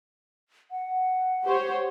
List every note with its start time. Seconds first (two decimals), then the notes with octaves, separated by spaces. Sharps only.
0.71 F#5
1.45 G4 C5 C#5